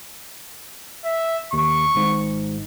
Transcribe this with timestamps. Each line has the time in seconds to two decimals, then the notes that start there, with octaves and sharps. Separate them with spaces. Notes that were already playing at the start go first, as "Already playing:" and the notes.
1.05 E5
1.53 D#2 C#6
1.95 G#1 G#2